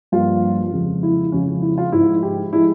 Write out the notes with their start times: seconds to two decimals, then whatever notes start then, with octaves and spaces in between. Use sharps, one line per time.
0.12 G2 F3 A#3 F4
0.72 F2 C#3 F3 G#3
1.03 E4
1.32 F2 C#3 F3 G#3 C#4
1.62 E4
1.78 F4
1.92 G#2 F3 G#3 E4
2.23 G4
2.53 F3 G#3 E4